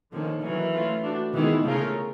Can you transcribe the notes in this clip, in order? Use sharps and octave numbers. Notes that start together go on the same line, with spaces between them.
D3 D#3 F3 A#3 C#4
D#3 E3 F#3 A#3 C#4
A3 C#4 F4
A3 D4 F#4
D#3 E3 G#3 B3 E4 G#4
C#3 A3 C#4 F4 A#4 C#5